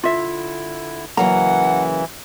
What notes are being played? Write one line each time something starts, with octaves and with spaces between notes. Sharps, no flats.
D3 E4 F4 E5
C#3 E3 F#3 A#3 F#5 A#5